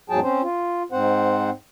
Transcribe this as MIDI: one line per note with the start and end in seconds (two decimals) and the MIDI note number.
0.10 0.20 40
0.10 0.20 44
0.10 0.20 54
0.10 0.20 68
0.10 0.20 79
0.10 0.20 81
0.23 0.42 60
0.23 0.42 61
0.23 0.42 72
0.43 0.83 65
0.92 1.50 44
0.92 1.50 60
0.92 1.50 72
0.92 1.50 78